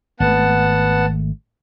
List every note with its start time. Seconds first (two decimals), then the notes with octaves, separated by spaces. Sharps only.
0.20 G#1 A3 B3 F#5 A5